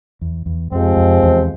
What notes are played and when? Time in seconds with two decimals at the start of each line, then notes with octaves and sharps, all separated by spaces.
0.21 E2
0.46 E2
0.71 F2 C3 F3 G#3 C4
0.97 F2
1.23 E2